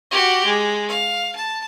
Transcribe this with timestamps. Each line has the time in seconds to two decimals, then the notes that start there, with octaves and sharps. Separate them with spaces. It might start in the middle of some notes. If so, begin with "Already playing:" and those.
0.11 F#4 G4
0.45 G#3
0.89 F5
1.36 A5